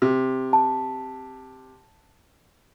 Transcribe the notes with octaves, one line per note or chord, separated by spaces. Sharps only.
C3
A5